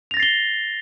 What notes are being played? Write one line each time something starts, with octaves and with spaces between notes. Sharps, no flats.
A6 A#6 C7 F7 G7